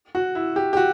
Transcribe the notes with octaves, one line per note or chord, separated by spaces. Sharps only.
F#4
E4
G4
G4
F#4